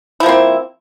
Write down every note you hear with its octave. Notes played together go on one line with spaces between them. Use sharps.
F3 A#3 C4 E4